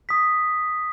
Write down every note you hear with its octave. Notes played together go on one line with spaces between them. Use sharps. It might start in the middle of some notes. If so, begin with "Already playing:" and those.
D#6 B6